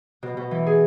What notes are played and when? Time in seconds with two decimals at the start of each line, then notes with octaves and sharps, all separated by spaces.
0.23 B2
0.37 B2
0.51 E3
0.67 G#4